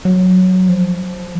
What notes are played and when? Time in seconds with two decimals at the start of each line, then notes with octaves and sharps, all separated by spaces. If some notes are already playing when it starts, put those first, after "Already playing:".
0.05 F#3
0.69 F3